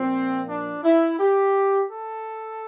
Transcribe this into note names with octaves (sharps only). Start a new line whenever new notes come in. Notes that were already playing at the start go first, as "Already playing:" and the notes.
Already playing: A#2 F3 C4
D4
E4
G4
A4